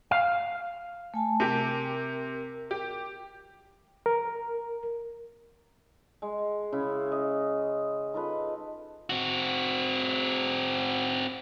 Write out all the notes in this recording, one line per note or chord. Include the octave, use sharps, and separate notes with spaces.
F5
A3 G#5 A5
C3 G4 A#4
G4
A#4
G#3
C#3 E4 B5
D#5
D#4 F4 A4 B4
C4 F#4